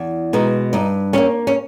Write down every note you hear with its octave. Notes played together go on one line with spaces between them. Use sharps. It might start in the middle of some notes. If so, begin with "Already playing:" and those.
Already playing: E2
B2 G#3 D#4
G2 D#4
G3 A#3 C#4
C#4